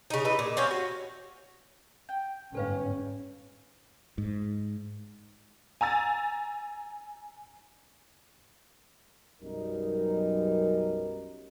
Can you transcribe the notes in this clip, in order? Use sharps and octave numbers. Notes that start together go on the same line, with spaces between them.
C#3 D#4
E3 B4 D#5
A#2
C4 C#4 C#5 F5
F#4
G5
G1 G#2 C#4 A4 B4 F5
G#2
G#5 A#5 E6 A6
B1 F#2 G3 D#4 A#4